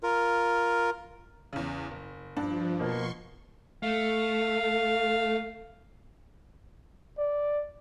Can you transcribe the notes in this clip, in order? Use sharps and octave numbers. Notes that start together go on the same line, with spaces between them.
F4 A#4
E2 C#3
F#1
G2 F3 D4
B2 A#3 C6 C#6
A3 F5
D5